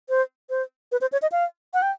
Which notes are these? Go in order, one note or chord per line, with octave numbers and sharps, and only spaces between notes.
C5
C5
B4
C5
C#5
D#5
F5
F#5
G5